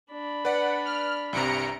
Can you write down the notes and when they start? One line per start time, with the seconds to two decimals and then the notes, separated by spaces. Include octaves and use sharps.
0.11 D4 B5
0.45 B4 D5 F#5
0.85 F6
1.33 C2 G2 C3 A#5 C#7 D7